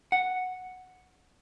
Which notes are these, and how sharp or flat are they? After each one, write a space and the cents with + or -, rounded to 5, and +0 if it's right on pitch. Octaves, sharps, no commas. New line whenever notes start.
F#5 -5